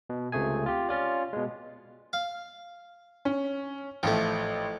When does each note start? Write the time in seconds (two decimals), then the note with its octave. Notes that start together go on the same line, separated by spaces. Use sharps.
0.10 B2
0.32 C#2 C3 A3 G#4 G#5
0.66 F4 G4
0.89 C#4 F4 D5
1.33 B2 G#3
2.13 F5
3.25 C#4
4.03 A1 F3 A3 G5